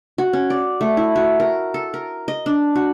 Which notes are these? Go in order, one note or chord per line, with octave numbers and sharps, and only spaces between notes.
F#4
C#4
D5
A3
E4
F#4
A#4
A4
A#4
D#5
D4
F#4